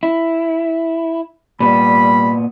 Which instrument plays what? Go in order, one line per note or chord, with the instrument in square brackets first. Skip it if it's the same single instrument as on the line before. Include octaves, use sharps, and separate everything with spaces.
[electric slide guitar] E4
[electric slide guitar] A#2 B3 [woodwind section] G3 B5